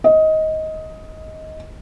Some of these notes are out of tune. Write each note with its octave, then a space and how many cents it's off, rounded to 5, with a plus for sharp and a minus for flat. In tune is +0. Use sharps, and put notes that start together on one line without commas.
D#5 +15